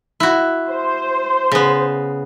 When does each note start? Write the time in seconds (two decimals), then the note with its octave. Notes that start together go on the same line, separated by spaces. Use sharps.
0.20 E4 F#4
0.69 C5
1.52 C#3 B3